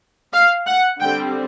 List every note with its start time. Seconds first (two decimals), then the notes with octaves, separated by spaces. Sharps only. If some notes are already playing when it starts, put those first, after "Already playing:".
0.34 F5
0.67 F#5
1.00 D3 G3 C4 G5